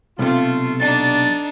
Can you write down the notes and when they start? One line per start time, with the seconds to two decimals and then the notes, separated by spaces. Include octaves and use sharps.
0.19 B1 C3 A3 F4
0.80 D4 D#4 F#4 D5 A6